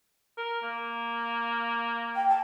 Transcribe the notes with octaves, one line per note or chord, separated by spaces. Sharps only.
A#4
A#3
G5
A5